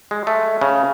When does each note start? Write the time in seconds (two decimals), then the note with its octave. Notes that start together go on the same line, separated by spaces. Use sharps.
0.11 G#3
0.27 A3
0.61 C#3